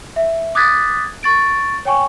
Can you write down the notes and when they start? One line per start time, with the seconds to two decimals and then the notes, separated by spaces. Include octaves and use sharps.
0.16 E5
0.55 D6 D#6 F#6 G#6 A6 B6
1.23 C#6 A6 D7
1.85 C#5 G5 G#5 C#6